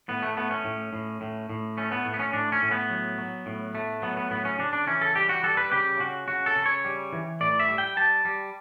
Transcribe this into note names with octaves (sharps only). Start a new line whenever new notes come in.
A2 B3
A3
A3 B3
C#4
A2
A2
A2
A2
A3 C#4
B3
A2
B3
C#4
A2 D4
C#4
A2
B3
F#3
F#3
A2
A3
F#3 B3
B3
A2 B3
C#4
C#3 D4
D4
E3 C#4
A4
G3 G4
F#4
G3 A4
B4
C#3 G4
C#3 F#4
C#3 F#4
A4
C#3
C#5
G3
E3
A2 D5
E5
G3
G5
G3 A5
G3